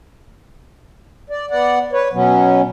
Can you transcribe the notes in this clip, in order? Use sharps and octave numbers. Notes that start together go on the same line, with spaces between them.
D5
B3 D5 F#5
B4 C#5
B2 F#3 B3 C#4